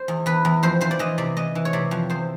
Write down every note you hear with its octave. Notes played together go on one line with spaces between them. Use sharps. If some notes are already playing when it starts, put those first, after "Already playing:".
Already playing: C5
E2
E2 B4
E2
F2 C5
E3 C5
D5
E3 D#5
C3 D5
E3 D#5
E3
C#5
C3 D5
F2
E2 C5